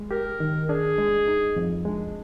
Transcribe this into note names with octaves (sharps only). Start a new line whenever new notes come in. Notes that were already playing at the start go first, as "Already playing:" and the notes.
Already playing: G#3
G4 A#4
D#3
D4 G#4
G#3
D#4
F2
G#3 D4